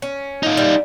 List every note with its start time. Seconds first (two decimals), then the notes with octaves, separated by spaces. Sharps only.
0.02 C#4
0.43 D#4 F4
0.57 G3